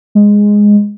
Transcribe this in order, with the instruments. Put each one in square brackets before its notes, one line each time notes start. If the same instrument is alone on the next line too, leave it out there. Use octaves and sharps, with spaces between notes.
[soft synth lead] G#3